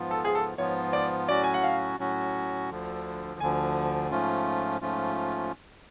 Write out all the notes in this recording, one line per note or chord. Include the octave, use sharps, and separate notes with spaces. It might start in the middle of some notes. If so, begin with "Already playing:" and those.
Already playing: G#2 F3 B3 F4
A4
G#4
A4
G#2 F3 B3 F4 C#5
D5
A2 F#3 C#4 F#4 D5
G#5
F#5
F5
A2 F#3 C#4 F#4
D2 D3 F3
D2 D3 F3 G#5
G#2 F3 A3 C#4 F4
G#2 F3 A3 C#4 F4